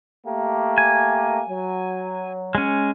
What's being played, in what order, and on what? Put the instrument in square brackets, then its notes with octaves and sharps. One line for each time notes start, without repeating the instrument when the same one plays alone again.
[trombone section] A3 A#3 G4
[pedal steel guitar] G#5
[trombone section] F#3
[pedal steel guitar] G#3 C#4